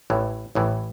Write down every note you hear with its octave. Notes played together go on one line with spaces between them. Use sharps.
A1 A2 E3
A1 A2 E3